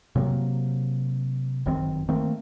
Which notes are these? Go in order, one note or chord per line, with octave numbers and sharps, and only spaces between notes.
C3 F#3 A#3
G1 F#2 D#3 C4
D#3 A3 A#3 C4